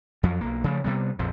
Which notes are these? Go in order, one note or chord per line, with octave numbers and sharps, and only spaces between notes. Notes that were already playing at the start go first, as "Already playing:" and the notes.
F2 F3 F#3
B1 A#3
C#3 F3 A3
C3 G3 B3
A#1 F2 F3